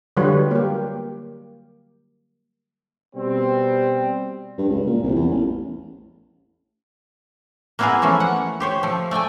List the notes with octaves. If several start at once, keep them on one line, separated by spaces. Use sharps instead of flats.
D3 F#3 G3 F4 B4 C#5
A#3 G4
B2 G3 C4
G2
C#2
A#2
C2
E2
A1
A#3 B3 E4 F4 G#4 A#4
E3 F3 A3 A#3 C#4
F#5
G4 C5 C#5
F3 A3
A3 D5 G5 G#5